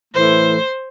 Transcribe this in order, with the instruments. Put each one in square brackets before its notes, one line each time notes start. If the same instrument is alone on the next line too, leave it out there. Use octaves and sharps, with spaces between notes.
[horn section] A2 E3 A3 [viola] C5